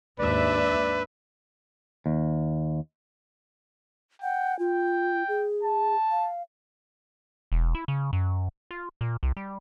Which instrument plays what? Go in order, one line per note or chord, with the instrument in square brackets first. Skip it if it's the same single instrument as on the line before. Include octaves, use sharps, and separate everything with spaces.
[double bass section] D#2 G#2 [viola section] D4 E5 [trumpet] B4 [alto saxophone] D5
[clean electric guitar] D#2
[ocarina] F#5 [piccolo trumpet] G5
[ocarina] F4 [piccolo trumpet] G5
[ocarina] G#4
[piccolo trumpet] A5
[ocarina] F5
[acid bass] E1
E4
C#3
F#2
F4
A#2
C2
G3